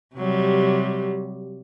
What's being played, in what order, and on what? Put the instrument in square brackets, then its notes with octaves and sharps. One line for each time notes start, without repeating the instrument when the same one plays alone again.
[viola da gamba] C3 F#3 G3